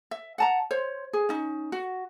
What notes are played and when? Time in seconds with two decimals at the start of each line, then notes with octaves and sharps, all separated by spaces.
0.11 E5
0.38 F#5 A5 A#5
0.71 C5 C#5
1.13 G#4
1.29 C#4 D#4
1.72 F#4